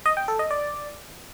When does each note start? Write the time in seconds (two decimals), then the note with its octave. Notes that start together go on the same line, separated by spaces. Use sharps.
0.06 D#5
0.17 G5
0.28 A4
0.39 D#5
0.51 D5